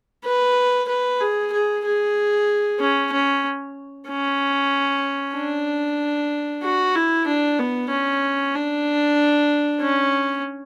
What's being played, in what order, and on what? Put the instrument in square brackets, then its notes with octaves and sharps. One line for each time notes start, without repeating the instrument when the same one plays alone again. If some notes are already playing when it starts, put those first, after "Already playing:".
[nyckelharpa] B4
B4
G#4
G#4
G#4
C#4
C#4
C#4
D4
F#4
E4
D4
B3
C#4
D4
C#4